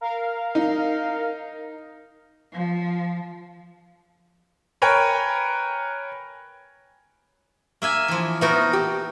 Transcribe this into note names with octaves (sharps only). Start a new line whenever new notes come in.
A#4 F5
D#4
F3
A#4 B4 C#5 G5 G#5 A#5
A#3 E5 G#5
E3 F3
B3 D#4 E4 F#4 A#4
G4